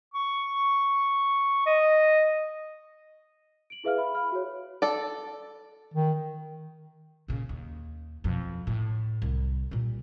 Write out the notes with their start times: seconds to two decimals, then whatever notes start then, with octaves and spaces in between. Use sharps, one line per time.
0.14 C#6
1.66 D#5
3.70 D7 F#7
3.84 E4 G#4 B4 E5 F5 F6
3.97 E5 B5
4.15 F5 B5 F6
4.32 F#4 C#5
4.82 A4 D5
5.94 D#3
7.28 A#2 C#3
7.49 D#2
8.24 F2 B2
8.67 A2
9.22 C2
9.71 A#2 G3